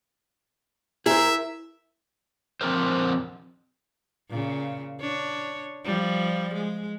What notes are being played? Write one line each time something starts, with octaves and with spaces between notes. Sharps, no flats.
E4 G#4 A#4 C5 E5
F3 C4 D4 A#4 C5
A#2 C#3
D4 C#5
F3 G3
G#3